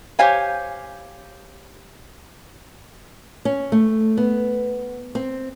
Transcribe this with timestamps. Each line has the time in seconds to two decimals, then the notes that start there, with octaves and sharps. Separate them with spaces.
0.19 G4 C5 C#5 F5 G#5
3.45 C#4
3.72 A3
4.17 B3
5.15 C4